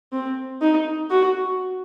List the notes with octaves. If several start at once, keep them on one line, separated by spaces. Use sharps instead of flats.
C4
D#4
F#4